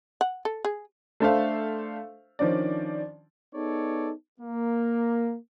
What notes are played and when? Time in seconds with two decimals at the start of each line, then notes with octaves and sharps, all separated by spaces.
0.21 F#5
0.45 A4
0.65 G#4
1.20 A3 D4 A4 C5 E5 F5
2.39 D#3 F3 C#4 D4 D5
3.55 B3 D#4 G#4 A4 C#5 D5
4.40 A#3